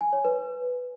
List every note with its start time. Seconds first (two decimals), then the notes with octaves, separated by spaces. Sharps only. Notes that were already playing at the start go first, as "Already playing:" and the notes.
0.01 G#5
0.13 C#5
0.25 B4